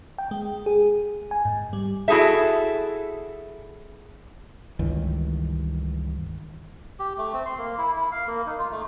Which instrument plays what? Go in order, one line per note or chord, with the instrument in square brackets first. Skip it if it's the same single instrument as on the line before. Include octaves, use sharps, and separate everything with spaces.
[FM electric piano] G5
G#3
G#4
G#5
G#2
G3
[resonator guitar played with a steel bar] E4 F#4 G#4 A4 E5
[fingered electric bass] C#2 G2 D#3 E3
[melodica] G4
A3
C4
C6
A#3
E4
E4
F5
A#3
D#4
F4
A3